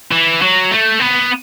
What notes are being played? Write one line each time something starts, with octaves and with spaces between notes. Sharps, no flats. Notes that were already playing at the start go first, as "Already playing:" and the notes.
E3
F#3
A3
B3